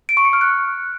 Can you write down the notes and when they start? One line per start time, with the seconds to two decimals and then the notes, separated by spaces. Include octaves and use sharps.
0.09 D7
0.17 C#6
0.25 C#7
0.33 F6
0.41 F#6